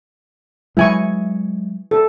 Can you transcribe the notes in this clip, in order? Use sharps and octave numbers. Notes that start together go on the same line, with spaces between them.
F#3 G#3 E4 G#5 C#6
A4